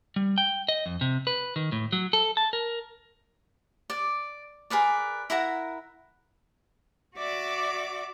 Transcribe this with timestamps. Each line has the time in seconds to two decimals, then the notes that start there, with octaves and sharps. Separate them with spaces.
0.16 G3
0.38 G5
0.69 D#5
0.86 F2
1.01 C3
1.27 B4
1.56 D#3
1.72 A2
1.92 F#3
2.13 A4
2.37 A5
2.53 A#4
3.90 D5
4.70 G#4 A#4 B4 D5
5.30 E4 A#4 F#5 A#5
7.18 F#4 D5 E5 D6